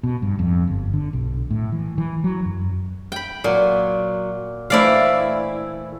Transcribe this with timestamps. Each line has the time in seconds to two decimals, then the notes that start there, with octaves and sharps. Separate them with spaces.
0.03 B2
0.22 G2
0.39 F2
0.67 G1
0.93 D3
1.13 B1
1.51 A2
1.72 E3
1.98 E3
2.24 F#3
2.45 F#2
3.12 G5 B5
3.44 A#2 F#3
4.70 E3 A3 E4 C5 D5 F5